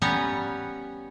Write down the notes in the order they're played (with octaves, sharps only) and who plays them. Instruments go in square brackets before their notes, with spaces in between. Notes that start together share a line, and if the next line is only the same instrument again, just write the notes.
[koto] G3 B3 C#4 C#5 A#5